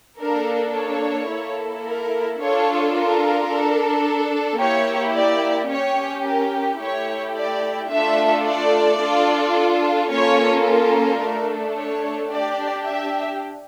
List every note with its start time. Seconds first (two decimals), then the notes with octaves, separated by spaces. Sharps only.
0.20 A#3 D4 A4 A#4
0.75 C#5
1.30 A#3 E4 A4
1.85 A#4
2.41 D4 F4 A4 C#5
2.95 A#4
3.50 D4 A4
4.60 A#3 E4 G4 C#5
5.15 D5
5.71 C#4 G4 C#5
6.25 A#4
6.81 A3 E4 G4 C#5
7.36 D5
7.91 A3 D4 F4 A4 E5
8.46 D5
9.01 D4 F4 A4
10.11 A#3 C#4 F4 A4 C#5
10.66 A#4
11.21 A3 D4 A4
11.77 C#5
12.31 D4 G4 D5
12.86 E5